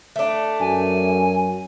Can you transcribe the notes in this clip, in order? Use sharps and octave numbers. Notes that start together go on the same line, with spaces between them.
A3 D4
F#2 G#5